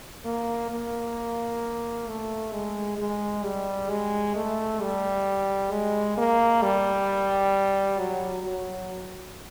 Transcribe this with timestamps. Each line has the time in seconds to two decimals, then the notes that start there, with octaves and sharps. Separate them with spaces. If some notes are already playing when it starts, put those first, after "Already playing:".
0.25 A#3
0.70 A#3
2.07 A3
2.52 G#3
2.98 G#3
3.44 G3
3.90 G#3
4.35 A3
4.81 G3
5.71 G#3
6.17 A#3
6.63 G3
7.99 F#3
8.44 F#3